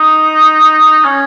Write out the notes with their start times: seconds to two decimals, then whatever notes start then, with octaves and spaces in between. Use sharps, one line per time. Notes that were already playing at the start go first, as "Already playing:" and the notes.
Already playing: D#4
1.05 C#4